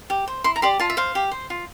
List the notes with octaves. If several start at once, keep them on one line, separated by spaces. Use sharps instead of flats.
G4
C5
E4 C6
A#5
G4 D5 C6
F4 A5
E5
C5 F5
G4
C5
F4